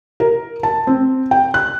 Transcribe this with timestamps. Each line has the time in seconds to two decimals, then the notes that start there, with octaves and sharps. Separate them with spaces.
0.20 A#4
0.63 A5
0.87 C4
1.31 G5
1.54 F#6